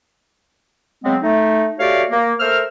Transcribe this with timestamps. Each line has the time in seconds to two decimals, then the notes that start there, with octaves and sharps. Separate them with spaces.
1.04 C#3 F#3 G#3 B3 C4
1.23 A3 D#4
1.79 A3 F#4 G4 C#5 D5 F5
2.10 A#3
2.40 A3 A#4 C5 E6 F6